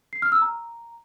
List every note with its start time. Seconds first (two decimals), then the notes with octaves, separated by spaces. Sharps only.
0.13 C7
0.22 F6
0.32 E6
0.42 A#5